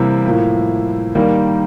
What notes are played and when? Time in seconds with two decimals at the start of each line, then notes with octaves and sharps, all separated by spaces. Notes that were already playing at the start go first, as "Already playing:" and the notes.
Already playing: C3 E3 G3 A#3 E4
0.25 A2 F3 A#3
1.15 D#3 G3 A#3